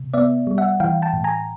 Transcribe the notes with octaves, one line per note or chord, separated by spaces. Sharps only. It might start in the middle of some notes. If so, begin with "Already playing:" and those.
Already playing: C3
B3 D5 E5
G3
E5 F#5
E3 F5 G5
G5 A5
A2
G#5 A#5